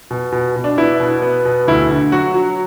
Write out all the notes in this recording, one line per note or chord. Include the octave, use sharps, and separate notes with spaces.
B2
B2
B2
D4
B3 E4
B2
B3
B2
D2 E4
D3
F#3 F#4
F#3